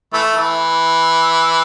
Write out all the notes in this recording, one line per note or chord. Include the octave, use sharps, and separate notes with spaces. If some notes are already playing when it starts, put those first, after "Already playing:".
E3 A3
E3